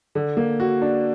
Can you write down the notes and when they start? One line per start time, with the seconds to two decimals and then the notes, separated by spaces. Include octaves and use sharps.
0.15 D3
0.37 A#3
0.60 F#4
0.82 D4